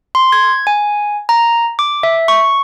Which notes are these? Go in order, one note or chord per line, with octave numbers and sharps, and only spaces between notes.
C6
G#6
G#5
A#5
D6
E5
C#6